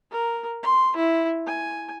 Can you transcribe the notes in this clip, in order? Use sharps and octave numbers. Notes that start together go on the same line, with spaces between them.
A#4
C6
E4
G#5